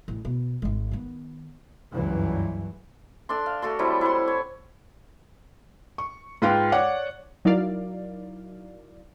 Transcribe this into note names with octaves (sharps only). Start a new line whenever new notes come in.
A1
B2
G#1 G#3
D#3 B3
F#1 C#2 G2 E3 F#3
D4 A4 D5 C6
F5
A3 F#4 A4 C6
F#3 G3 C4 E4
E4 F#5 C6
C#5
C#6
G#2 F4 B4 F5 G5
C#5 D5 F#5 D6
F#3 D#4 E4 A#4 D5 F5